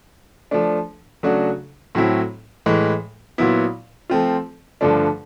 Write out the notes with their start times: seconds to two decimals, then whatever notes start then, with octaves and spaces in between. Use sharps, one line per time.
0.51 F3 A3 D4
1.23 C#3 F#3 A3 D4 F#4
1.95 A2 F#3 A3 C4 E4
2.66 A2 E3 G#3
3.38 A#2 F#3 B3 E4
4.10 F3 A3 C4 F4
4.81 G2 D3 F3 A3 D4